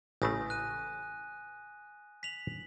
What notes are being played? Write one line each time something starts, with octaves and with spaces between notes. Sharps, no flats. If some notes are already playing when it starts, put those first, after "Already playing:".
A1 C#3 A3 G#5 D#6 A#6
F#6 D#7
B6 F7 F#7